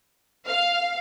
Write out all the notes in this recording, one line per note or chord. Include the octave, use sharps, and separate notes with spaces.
F5